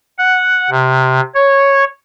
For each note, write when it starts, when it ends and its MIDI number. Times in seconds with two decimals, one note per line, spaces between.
0.18 0.70 78
0.70 1.20 48
1.35 1.85 73